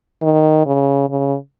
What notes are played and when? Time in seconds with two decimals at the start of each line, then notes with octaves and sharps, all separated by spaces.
0.22 D#3
0.66 C#3
1.09 C#3